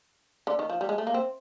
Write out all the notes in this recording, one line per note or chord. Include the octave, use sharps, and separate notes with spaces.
D3
D#3
F3
G3
G#3
A3
A#3
C4